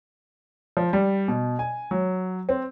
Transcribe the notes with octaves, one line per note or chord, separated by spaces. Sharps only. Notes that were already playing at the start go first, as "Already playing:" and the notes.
F3
G3
B2
G#5
F#3
C4